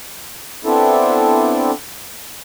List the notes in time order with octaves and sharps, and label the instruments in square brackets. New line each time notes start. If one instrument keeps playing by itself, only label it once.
[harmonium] B3 C4 D4 E4 A4